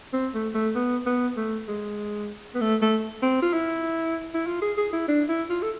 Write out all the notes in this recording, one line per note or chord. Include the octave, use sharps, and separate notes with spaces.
C4
A3
A3
B3
B3
A3
G#3
B3
A3
A3
C4
F4
E4
E4
F4
G#4
G#4
E4
D4
E4
F4
A4